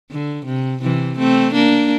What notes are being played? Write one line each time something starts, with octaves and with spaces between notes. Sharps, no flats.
D3
C3
C3 E3
A3 C4
A#3 D4